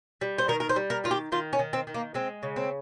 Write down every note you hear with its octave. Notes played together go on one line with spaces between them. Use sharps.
G3
C5
D#3 A#4
A#4
C5
G3
A#4
D#3 F4
G4
D#3 F4
C#4
D#3
C4
D#3
A#3
G#3 C4
C#3
C4